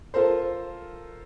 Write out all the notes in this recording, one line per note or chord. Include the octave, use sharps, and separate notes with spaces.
F4 A4 A#4 C5